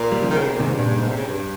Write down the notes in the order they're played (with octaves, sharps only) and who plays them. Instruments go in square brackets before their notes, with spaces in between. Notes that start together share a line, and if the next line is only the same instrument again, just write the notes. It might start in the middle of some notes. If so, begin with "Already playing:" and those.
Already playing: [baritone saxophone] A#2
[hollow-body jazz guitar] G3
C#3 F3
[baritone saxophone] D#3
C#3
C3
A#2
[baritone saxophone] G#2 [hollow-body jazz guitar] C3 D#3
[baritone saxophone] G2
[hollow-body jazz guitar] A#2 C#3
[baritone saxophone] G2
G#2
C3
C#3
G2